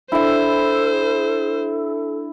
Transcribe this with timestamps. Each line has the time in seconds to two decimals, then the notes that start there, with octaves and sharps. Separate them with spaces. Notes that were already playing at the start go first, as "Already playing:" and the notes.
0.12 D4 E4 A4 C5 E5